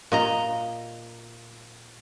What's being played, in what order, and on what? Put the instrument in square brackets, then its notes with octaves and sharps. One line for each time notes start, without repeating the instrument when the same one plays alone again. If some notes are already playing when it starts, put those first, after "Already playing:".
[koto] A#2 D#5 A#5